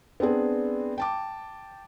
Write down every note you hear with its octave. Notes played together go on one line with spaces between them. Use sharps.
B3 C4 D4 G#4
G5 A5 D6